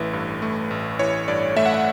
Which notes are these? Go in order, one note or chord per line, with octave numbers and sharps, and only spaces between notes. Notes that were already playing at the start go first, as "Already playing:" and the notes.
Already playing: A1 E3 A3 B4
G2
A3
A1
E3 C#5
G2 D5
A3 E5
F#5
E5